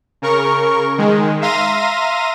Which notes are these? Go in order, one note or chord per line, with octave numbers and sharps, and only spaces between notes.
C#3 A#4 C#6
D#3 G#3
E5 F5 A#5 C6 A#6 D#7